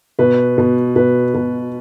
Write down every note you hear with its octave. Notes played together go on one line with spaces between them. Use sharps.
B2 B4
B2
B2 B4
B2